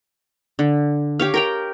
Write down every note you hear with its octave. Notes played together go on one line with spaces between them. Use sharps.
D3
G4 C#5 F5
A#4 G5 A#5